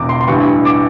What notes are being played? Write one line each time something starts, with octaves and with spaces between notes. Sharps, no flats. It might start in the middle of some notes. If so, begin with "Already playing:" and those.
Already playing: E1 E2 B2 D6
C6
C6
A1 G2 E3 C#6
D6